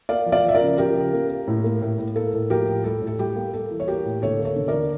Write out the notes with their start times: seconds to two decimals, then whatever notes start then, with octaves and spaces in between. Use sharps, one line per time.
0.09 A#3 D5 F5
0.26 F3
0.32 D5 F5
0.44 F3 E5
0.55 A#4 D5
0.61 C#3
0.78 F3 G4 A#4
0.95 C#3
1.13 A#3
1.29 A#3
1.48 A2
1.64 A#3
1.82 A2
1.98 A2
2.16 A#3 A4
2.33 A2
2.50 F3 G4 A#4
2.68 A2
2.84 G3 A4
3.02 A2
3.07 A4
3.19 G3 G4
3.36 A#3
3.54 A#3 A4
3.71 E3
3.80 C#5
3.87 A#3 G4 A#4
4.06 A2
4.22 D3 A4 C#5
4.39 A#3
4.45 A4 C#5
4.56 D3
4.68 A#4 D5
4.74 D3